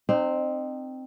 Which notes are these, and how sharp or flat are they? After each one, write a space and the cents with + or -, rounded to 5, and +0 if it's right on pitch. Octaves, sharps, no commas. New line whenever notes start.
C4 +0 D#4 -35